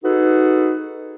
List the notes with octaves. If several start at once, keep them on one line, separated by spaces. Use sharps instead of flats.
D#4 F#4 G#4 A4 B4